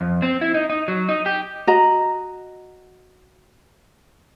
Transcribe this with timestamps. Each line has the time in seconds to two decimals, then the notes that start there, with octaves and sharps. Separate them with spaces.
0.01 F2
0.22 C4
0.41 E4
0.54 D#4
0.70 D#4
0.88 F#3
1.09 D#4
1.26 G4
1.67 F#4 D#5 A#5